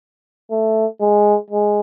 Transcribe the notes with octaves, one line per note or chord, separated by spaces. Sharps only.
A3
G#3
G#3